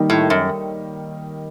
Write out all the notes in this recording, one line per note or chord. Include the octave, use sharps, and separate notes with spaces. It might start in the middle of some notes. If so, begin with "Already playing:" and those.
Already playing: D#3 G3 A#3 D#4
A2
F#2